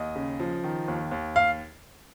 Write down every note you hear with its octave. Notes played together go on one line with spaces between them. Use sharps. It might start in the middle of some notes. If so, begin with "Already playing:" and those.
Already playing: D#2 D#5
C#3
F3
D#3
D#2
D#2
F5